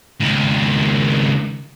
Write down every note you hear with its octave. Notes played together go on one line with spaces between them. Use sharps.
C#2 D#3